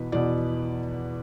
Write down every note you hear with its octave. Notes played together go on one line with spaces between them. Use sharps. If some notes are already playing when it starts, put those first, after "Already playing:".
Already playing: E2 B2 B4
E2 B2 D5